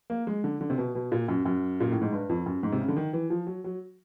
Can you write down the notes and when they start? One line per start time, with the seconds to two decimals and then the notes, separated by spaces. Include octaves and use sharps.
0.10 A#3
0.27 G#3
0.44 D3
0.61 D3
0.70 C3
0.78 B2
0.95 B2
1.12 A#2
1.28 F#2
1.45 F#2
1.80 A#2
1.92 A2
2.02 G#2
2.12 G2
2.29 F2
2.46 F#2
2.63 G#2
2.72 C3
2.81 C#3
2.88 D3
2.97 D#3
3.13 E3
3.30 F3
3.47 F#3
3.64 F#3